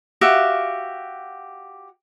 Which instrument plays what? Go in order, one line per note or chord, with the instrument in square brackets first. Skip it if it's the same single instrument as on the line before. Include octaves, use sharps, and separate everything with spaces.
[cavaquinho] F#4 G4 E5 F5